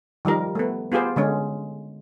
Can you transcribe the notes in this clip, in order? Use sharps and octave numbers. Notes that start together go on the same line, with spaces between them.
D#3 F3 G3 A#4
A3 B3
B3 F4 G4 G#4 C5
D3 G#3 C#4